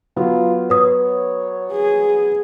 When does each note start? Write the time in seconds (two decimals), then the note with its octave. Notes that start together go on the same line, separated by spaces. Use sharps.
0.17 F#3 B3 F4
0.70 B4 C#5 D#6
1.72 G#4